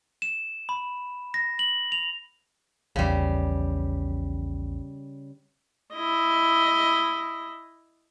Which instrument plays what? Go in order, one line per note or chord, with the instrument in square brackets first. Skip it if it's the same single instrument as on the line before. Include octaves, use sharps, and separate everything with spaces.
[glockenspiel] E7
B5
A#6
F#7
F7
[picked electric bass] A#1 E2 [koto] C#3 G3
[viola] E4 D#5